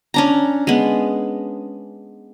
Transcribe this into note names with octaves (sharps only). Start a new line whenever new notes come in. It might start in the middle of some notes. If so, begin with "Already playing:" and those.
C#4 D4 A#5
G#3 B3